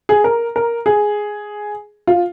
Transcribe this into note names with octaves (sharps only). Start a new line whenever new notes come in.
G#4
A#4
A#4
G#4
F4